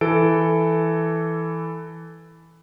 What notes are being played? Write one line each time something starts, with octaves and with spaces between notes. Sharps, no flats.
E3 A4 D7